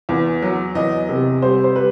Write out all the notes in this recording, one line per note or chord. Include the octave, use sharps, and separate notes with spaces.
E2
F#3
E2 D#5
C3
G3 C5
C5
G3 B4